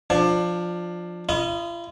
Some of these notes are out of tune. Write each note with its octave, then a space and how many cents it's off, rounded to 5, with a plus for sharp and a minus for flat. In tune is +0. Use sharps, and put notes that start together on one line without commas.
F3 +5 D4 +20
F4 -40 D#5 +0 B5 -20